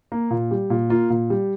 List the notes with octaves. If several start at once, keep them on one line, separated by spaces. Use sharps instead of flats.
A#3
A#2
G3
A#2
A#3 F4
A#2
G3